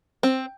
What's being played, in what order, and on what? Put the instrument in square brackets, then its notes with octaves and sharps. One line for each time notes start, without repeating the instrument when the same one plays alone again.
[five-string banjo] C4